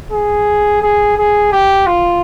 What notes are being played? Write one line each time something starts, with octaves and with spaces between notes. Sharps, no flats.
G#4
G#4
G#4
G4
F4